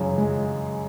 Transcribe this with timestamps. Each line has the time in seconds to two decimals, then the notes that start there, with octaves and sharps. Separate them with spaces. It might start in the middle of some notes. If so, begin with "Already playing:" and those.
Already playing: F#2 C#3 E3
0.18 G#3